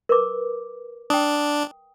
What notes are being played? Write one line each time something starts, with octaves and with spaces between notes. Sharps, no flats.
A#4 B4 D6
D4 G5 D#6